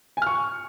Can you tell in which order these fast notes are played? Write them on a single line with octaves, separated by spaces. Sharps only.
G#5 F6 C#6